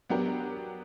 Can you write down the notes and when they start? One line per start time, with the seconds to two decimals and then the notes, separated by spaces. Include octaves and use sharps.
0.09 F#3 B3 D4 G4 A#4